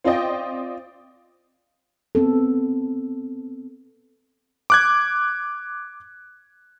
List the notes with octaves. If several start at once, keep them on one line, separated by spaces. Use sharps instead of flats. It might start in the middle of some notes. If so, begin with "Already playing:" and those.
C4 F4 C5 D5 D#5 G5
B3 C4 A4
D6 F#6 G#6